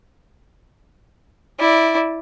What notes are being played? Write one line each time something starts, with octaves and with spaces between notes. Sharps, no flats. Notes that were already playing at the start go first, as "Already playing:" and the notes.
E4 D5